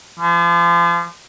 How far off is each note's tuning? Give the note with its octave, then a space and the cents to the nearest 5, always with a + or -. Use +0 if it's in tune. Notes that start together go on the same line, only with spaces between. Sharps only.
F3 -35